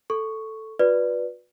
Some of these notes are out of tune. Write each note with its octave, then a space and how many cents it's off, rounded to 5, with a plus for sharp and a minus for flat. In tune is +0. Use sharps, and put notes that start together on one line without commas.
A4 +0 C#6 +0
F#4 -40 B4 -10 D5 +0